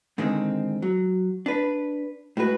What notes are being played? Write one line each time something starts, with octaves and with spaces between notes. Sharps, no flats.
G#2 D3 D#3 G#3 C4
F#3
D4 B4
A2 G#3 F#4 B4